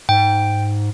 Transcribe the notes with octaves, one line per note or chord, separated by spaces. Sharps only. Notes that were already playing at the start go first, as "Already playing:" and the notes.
G#2 G5